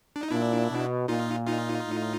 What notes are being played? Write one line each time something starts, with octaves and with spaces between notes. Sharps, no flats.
D4
D#4
A#2 D4 E4
B2
A#2 D#4 F4
D#4 F4
A2